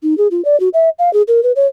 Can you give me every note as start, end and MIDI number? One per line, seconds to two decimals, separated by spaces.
0.03 0.17 63
0.18 0.28 68
0.31 0.43 65
0.45 0.59 74
0.60 0.69 66
0.74 0.89 76
0.99 1.12 77
1.13 1.22 68
1.28 1.43 70
1.43 1.52 71
1.56 1.67 73